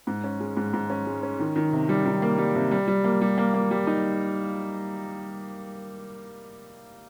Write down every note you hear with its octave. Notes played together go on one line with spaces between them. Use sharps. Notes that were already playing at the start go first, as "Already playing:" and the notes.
G#2
C#4
G#3
G#2
G#2
C#4
G#3
C#4
D#3
D#3
C3
G3
D#3
A#3
G3
C3
G3
G3
A#3
G3
A#3
A#3
G3
D#4